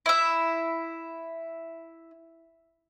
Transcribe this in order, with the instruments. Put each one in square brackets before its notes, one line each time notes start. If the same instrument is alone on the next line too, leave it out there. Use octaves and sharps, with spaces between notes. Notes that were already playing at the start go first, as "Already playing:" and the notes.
[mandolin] E4 E5